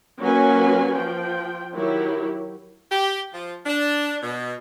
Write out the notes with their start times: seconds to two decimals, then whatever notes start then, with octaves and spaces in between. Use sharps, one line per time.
0.20 F#3 A#3 C#4 F#4 B4 G#5
0.95 F3 G5
1.73 D#3 F#3 E4 G4
2.91 G4
3.33 F3
3.66 D4
4.22 B2